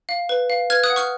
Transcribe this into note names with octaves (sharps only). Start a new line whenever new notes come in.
F5
B4
F5
B4 F6 G#6
D#6 F#6
F#5
C#6 F6